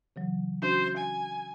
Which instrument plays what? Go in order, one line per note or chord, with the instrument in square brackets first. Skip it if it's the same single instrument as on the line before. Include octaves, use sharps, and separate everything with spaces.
[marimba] C#3 E3 F#3
[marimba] C#4 D4 F#4 [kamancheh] C5
[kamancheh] G#5